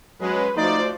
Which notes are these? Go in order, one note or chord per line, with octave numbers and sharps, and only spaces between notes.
F#3 G#3 C#4 B4
F3 A3 D#4 F#4 C5 D5